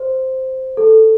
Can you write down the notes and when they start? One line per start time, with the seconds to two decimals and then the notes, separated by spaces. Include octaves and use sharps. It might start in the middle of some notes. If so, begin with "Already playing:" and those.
Already playing: C5
0.77 A4